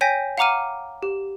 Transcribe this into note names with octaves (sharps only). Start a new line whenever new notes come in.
C#5 G5 G#5 G6 A#6 B6
F5 F#5 A#5 D6 F6 D#7
G4